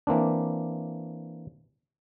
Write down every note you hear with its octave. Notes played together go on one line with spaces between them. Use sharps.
E3 A#3 C4 D4